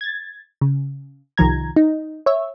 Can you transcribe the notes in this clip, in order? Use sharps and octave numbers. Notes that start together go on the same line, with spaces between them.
G#6 A6
C#3
C2 D#3 F3 A#5 G#6
D#4
C#5 E5